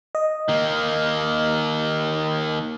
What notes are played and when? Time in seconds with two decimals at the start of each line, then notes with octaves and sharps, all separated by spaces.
0.15 D#5
0.48 D#3 A#3